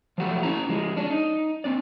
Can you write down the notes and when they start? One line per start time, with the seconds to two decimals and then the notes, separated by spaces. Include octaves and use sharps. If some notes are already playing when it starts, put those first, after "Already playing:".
0.18 F3 F#3 A3 F#4 G4
0.43 C#4 E4 A#5
0.69 F3 G#3
0.96 C#4 D4
1.10 D#4
1.64 C4 D4 D5